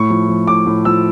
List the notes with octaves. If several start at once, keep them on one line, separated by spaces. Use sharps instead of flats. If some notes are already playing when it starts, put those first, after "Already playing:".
Already playing: A2 C#6
F3
F3
A2 D6
A2
F3 E6